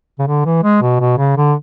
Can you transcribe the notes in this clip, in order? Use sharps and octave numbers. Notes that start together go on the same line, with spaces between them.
C#3
D3
E3
G#3
B2
B2
C#3
D3